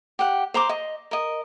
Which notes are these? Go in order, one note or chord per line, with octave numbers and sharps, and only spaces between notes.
G4 F#5
C5 A#5 C6 D6
D#5
A#4 D#5